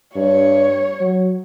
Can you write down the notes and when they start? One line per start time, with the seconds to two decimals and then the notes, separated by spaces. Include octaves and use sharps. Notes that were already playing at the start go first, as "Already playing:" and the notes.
0.16 G2 C#5
1.00 F#3